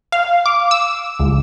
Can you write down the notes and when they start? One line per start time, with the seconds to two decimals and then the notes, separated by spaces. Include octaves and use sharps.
0.12 F5
0.46 D6
0.71 E6
1.19 C#2